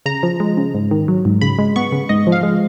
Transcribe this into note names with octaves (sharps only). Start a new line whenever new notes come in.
C#3 A#5
F3
G#3
C#3
G#2
D#3
F#3
G#2
C#3 B5
G#3
B3 C#6
C#3
G#2 D#5
F3
F5
G#3